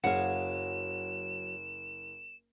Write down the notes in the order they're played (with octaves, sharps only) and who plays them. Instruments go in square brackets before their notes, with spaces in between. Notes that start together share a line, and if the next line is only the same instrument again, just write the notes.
[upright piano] F#1 [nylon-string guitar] F#3 G#4 [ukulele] F5 F#5 [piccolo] E7